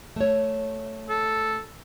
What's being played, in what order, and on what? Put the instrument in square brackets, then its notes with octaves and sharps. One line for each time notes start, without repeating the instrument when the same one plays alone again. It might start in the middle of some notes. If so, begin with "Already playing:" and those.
[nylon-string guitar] A3 C#5
[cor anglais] A4